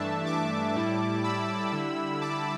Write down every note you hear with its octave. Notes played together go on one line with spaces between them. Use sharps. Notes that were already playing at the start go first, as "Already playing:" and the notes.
Already playing: G2 E3 A3 D4 E5 A5
A5 D6
A2 G3 E4
B5 E6
D3 G3 E4
A5 D6